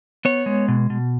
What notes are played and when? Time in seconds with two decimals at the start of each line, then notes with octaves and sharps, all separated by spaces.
0.25 B3 C#5
0.46 G#3
0.68 B2
0.90 B2